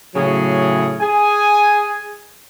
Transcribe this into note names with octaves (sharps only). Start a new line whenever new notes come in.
A2 C#3 F#3 G#4
G#4 G#5